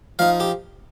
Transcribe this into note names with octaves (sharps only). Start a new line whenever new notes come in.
F3 D#4 F5
G4